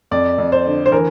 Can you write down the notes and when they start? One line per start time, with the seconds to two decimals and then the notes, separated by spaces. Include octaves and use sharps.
0.11 F2 D5
0.38 F2
0.52 C5
0.66 D3
0.86 C5
0.92 E3 A#4